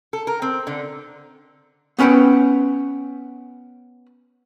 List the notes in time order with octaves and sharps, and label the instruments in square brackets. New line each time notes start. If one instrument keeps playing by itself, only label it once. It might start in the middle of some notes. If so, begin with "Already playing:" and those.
[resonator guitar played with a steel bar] A4
A#4
C4
D3
[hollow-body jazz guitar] B3 C#4 B4 F#5 G5